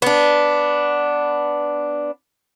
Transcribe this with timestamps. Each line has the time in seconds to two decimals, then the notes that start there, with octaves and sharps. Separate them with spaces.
0.02 B3 D4